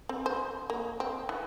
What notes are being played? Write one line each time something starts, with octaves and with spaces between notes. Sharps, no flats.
C4
C5
A#3
C4
E3